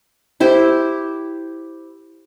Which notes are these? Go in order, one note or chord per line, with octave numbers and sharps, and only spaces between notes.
E4 G4 C5